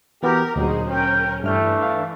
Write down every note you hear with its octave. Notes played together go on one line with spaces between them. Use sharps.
E3 B3 F#4 G4 A#4
D2 A#2 F#3 D#4 F#4 G#4 C5
C#4 A#4 G5
G2 E3 A3 D4 F6 G6
F5